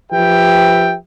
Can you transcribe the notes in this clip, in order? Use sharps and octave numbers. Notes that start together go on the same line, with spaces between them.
F3 G4 B4 E5 G5